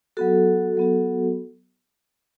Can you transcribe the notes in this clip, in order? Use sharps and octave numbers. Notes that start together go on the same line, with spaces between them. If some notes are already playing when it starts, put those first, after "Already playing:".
F#3 B3 F#4 A4
F#3 B3 F#4